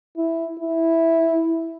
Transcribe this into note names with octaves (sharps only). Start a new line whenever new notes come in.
E4
E4